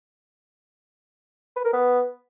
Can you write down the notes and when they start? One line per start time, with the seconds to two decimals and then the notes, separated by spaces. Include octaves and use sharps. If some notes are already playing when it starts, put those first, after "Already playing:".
1.56 B4
1.65 A#4
1.73 B3